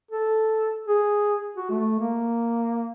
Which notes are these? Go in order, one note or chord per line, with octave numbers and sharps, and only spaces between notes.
A4
G#4
F#4
A3
A#3